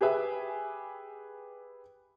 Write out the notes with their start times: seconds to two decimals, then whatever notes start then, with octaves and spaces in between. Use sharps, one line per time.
0.01 G4 G#4 B4 E5 G#5